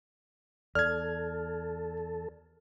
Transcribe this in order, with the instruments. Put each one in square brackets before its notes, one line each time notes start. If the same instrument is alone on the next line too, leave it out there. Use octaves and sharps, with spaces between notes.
[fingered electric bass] E2 [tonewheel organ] A4 [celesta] D5 [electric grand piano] F6 G#6